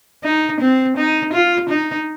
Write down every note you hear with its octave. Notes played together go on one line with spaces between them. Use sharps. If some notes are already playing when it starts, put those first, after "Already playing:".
D#4
C4
D#4
F4
D#4